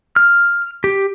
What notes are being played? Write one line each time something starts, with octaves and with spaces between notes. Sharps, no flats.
F6
G4